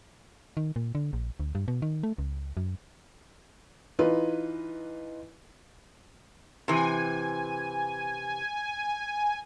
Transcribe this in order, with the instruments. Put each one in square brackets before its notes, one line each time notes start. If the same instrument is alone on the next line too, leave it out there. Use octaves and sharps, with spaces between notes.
[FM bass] D#3
A#2
D3
A#1
D2
G2
B2
D#3
A3
C#2
F#2
[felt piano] E3 D#4 F4 B4
[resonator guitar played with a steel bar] C3 E3 [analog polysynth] G#5